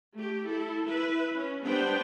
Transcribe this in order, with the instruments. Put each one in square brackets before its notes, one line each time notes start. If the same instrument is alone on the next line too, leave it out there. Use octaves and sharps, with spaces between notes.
[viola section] A3 G4
E4 A4
E4 B4 E5
C#4
G3 B3 D4 B4 C5 G5